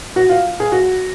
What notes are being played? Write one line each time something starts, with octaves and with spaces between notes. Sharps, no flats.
F#4
F4
G#4
F#4